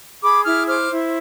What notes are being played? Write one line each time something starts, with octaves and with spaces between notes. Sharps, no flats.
G#4 B5 D6
E4 D6 F6
C5 D6 F6
E4